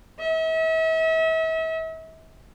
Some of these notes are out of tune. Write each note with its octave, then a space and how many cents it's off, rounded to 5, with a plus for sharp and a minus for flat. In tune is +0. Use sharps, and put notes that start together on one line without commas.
E5 -40